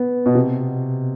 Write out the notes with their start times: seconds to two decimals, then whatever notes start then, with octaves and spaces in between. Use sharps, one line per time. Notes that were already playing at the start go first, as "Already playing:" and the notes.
Already playing: B3
0.26 B2
0.35 C3